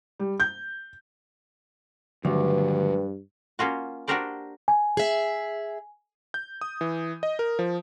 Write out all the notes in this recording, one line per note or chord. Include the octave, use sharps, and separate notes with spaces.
G3
G6
D2 G2 D#3 F3 F#3 B4
A#3 C#4 F4 F#4
D4 F#4 G4 A#4 C5 D5
G#5
G#4 E5
G6
D#6
E3
D#5
A#4
F3